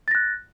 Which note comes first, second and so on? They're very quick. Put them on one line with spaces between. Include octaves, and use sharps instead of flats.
A6 A#6 F#6